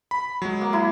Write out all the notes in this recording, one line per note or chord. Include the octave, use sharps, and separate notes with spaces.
B5
F#3 G#3
A#3
E4